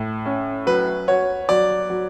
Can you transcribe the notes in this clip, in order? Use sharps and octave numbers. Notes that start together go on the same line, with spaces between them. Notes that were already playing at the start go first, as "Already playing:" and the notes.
Already playing: A2
C#4
F#3 B4
F#4 C#5
F#3 D5
F#3